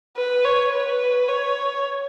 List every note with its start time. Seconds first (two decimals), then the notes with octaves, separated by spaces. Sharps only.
0.17 B4
0.45 C#5
0.73 B4
1.29 C#5